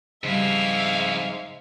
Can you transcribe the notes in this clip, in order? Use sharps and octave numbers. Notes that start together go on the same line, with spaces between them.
F2 G#2 C#3 G3 E4 E5 F5